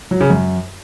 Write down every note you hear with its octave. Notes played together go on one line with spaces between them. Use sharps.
F#3
C#3
F#2